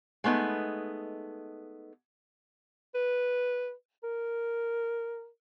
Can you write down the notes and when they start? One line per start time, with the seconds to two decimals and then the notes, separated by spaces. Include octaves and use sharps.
0.24 G#3 A3 B3 D#4
2.95 B4
4.03 A#4